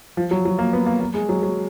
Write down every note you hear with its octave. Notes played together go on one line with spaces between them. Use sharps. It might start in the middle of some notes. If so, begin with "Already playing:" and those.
F3
F#3
F#3
A#3
B3
A#3
A#3
G#3
F#3
F#3